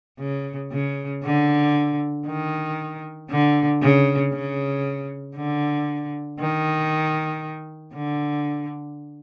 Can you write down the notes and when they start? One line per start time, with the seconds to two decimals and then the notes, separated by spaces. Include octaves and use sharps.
0.19 C#3
0.71 C#3
1.24 D3
2.27 D#3
3.30 D3
3.82 C#3
4.32 C#3
5.36 D3
6.40 D#3
7.94 D3